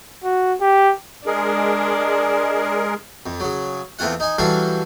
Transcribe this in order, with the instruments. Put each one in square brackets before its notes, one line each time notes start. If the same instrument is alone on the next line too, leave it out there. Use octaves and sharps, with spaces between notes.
[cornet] F#4
G4
[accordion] G#3 G#4 A#4 [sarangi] D4
[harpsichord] F2
C#3 F#3
E2 A3 C4 F4 F#5
D#4 G#5
E3 F#3 G3 D4 A4 F5